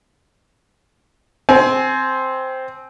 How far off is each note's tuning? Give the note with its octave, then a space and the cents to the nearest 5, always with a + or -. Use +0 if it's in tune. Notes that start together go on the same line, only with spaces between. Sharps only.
C4 +0 G#5 +30